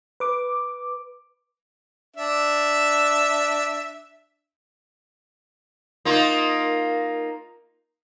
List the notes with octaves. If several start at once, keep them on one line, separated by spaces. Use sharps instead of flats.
B4 D6
D4 E5
A#3 D#4 F4